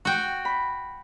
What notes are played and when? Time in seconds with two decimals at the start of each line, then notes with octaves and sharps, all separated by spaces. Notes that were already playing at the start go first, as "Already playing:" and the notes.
0.05 F#4 G5
0.45 B5